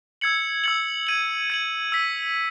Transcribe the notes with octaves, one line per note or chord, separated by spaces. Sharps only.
E6 G#6 C#7 F#7
E6 G#6 C#7 F#7
G#6 D#7 F#7
G#6 D#7 F#7
E6 B6 D#7